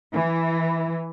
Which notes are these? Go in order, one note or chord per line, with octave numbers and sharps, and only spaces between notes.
E3